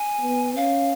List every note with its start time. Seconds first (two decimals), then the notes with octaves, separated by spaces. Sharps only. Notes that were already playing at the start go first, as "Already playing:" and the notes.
Already playing: G#5
0.22 B3
0.56 C#4 F5